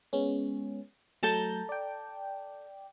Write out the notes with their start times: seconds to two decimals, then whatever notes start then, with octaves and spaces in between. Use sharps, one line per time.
0.13 G#3 B3 C#4
1.23 F#3 A3 A4 A5 A#5 G6
1.69 D5 G5